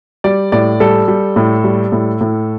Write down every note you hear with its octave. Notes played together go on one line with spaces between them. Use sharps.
G3 D5
A2 D5
G3 A4
G3
A2
G3
A2
A2